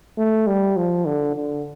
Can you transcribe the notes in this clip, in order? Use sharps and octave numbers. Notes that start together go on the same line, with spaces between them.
A3
G3
F3
D3
D3